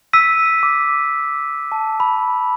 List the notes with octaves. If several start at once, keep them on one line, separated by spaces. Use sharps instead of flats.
E6 B6 D#7
D6
A5
B5